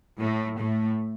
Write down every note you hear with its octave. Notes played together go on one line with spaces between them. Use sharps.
A2 A3
A2 A3